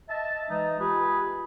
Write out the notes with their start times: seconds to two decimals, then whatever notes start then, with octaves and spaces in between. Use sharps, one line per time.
0.10 D#5 E5 A5
0.50 E3 G#3 D#4
0.80 F4 G4 G#4 B4